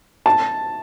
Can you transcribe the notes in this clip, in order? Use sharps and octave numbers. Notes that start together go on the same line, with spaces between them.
A5